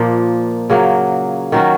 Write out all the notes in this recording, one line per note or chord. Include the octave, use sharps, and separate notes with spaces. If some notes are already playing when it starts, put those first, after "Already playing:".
Already playing: A#2 F3 A#3
C#3 F#3 A#3
D#3 F#3 C#4 F#4